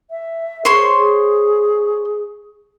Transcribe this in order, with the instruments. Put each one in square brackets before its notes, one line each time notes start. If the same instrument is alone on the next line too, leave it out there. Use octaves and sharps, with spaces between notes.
[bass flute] E5
[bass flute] G#4 [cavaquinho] C5 C#5 C6
[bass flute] G#4